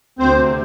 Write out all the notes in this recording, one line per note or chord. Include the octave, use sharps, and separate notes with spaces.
D2 C4 C5
C3